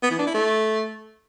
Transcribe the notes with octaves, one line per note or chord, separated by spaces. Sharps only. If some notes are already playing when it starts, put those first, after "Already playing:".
B3
E3
D4
E4
A3